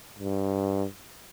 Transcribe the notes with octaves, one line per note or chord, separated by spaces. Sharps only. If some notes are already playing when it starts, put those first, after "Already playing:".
G2